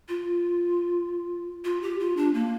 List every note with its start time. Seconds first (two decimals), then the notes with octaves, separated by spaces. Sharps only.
0.08 F4
1.65 F4
1.82 G4
2.00 F4
2.17 D4
2.34 A#3